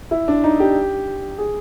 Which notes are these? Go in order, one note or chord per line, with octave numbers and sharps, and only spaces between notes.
E4
D4
D#4
G4
G#4